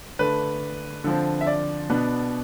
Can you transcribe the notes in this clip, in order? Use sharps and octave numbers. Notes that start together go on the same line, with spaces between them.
D3 A3 D4 B4
D3 F3 C4
E5
D5
B2 B3 D4